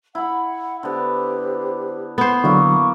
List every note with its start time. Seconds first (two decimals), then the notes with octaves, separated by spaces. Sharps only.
0.15 E4 F#5 B5
0.83 D3 B3 G4 C5
2.18 B3 C5
2.44 D3 F#3 A#3 E4 F#4 C#6